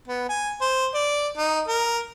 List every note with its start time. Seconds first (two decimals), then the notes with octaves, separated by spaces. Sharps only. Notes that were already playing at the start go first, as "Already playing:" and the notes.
0.07 B3
0.29 G#5
0.61 C5
0.94 D5
1.37 D#4
1.67 A#4